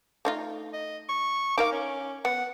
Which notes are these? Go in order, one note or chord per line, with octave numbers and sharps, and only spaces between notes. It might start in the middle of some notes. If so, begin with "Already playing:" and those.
A3 D#4 F4
D#5
C#6
D#4 A#4 F5 D6
C#4
B3 F#5